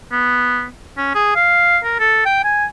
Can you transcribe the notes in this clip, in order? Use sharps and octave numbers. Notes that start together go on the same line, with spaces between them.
B3
C#4
G#4
F5
A#4
A4
G5
G#5